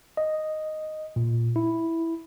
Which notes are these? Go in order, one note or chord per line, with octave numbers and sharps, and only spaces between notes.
D#5
A#2
E4